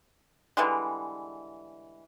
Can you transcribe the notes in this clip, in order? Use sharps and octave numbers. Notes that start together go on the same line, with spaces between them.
D3 E3 G3 G#3